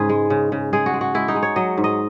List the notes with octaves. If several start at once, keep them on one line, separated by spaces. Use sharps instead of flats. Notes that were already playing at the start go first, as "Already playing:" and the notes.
Already playing: G#2 C#3 G#4 B4
G#3
C#3
C#3
G#3 G#4
F#4
G#3
F#4
G#3 E4
D#4
G#3
C#5
F#3 D#5
G#2
D#5